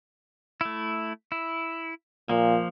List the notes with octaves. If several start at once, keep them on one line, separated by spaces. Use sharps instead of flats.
A3 E4
E4
A#2 F3 A#3